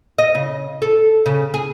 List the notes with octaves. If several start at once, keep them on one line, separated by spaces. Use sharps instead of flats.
D#5
C#3
A4
C#3
G#4